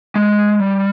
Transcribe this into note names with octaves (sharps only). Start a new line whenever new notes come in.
G#3
G3